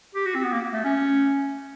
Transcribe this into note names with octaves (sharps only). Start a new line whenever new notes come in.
G4
F#4
C4
B3
A#3
A3
C#4